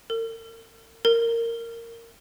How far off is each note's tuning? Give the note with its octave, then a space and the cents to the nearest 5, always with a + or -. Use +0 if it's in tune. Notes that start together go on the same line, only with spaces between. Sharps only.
A#4 -45
A#4 -15